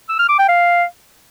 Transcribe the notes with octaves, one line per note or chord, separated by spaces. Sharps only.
E6
F6
D6
G5
F5